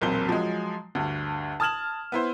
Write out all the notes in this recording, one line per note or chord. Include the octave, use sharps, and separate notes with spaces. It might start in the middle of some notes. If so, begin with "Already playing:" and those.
E1 B1 A#2 C4 G7
F3 F#3 G#3
D2 G2
A5 D#6 F6 G#6 E7 F#7
B3 E4 C5